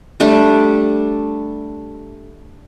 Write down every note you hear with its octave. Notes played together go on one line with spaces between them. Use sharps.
G3 A3 D4